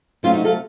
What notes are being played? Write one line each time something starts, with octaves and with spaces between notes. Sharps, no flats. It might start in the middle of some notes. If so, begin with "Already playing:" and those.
C3 F#3 A3 C#4 F4
D#4 F#4
F4 A4